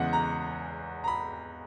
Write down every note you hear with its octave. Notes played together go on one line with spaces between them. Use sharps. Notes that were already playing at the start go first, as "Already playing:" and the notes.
Already playing: E2 C#3 E3 G#3 F#5
A#5
A#5
B5